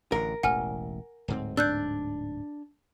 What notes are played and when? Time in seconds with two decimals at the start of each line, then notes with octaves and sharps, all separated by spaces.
0.12 A1 D3 A#4
0.43 E1 A1 F#5 G#5 F6
1.28 D1 G#2 C4
1.57 D4 E6 F#6 G6